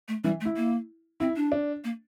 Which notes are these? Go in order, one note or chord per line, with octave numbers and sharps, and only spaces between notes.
A3
E3 G3
A3
E4
A#3
C4 E4
D4
D4
A#3